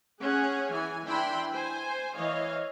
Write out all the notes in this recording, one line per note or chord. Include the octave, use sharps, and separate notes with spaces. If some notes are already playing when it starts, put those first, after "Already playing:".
C#4 G#4 F#5
E3 G#5
E3 D4 E4 G5 B5 C6
C5 G#5
E3 C#5 D#5 F5